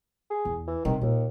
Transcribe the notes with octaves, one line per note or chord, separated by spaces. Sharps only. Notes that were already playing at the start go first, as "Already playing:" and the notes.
G#4
E2
E3
C3 D#3 G3
D#2 A#2